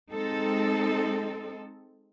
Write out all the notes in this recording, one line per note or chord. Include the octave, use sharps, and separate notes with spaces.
G#3 C4 D#4 A4